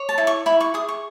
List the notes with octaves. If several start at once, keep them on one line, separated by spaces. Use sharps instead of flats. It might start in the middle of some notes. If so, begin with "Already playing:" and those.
Already playing: C#5
A5
E4
C#6
E4 B5
C#6
G#4 D#6
C#6